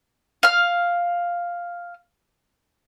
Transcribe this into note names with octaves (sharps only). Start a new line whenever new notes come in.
F5 F6